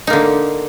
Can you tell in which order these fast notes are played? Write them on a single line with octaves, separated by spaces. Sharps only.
D#4 A#3 D3